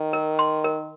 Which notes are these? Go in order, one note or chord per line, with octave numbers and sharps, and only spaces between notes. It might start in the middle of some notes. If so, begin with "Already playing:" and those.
Already playing: D#3
A#4
C6
A#4